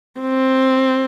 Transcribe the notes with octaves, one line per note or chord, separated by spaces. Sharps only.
C4